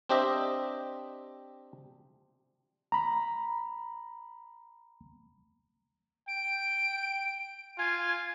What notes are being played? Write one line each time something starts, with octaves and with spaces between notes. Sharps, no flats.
C4 D4 G4 C5 D#5 E5
A#5 B5
G5 D7
F4 G#5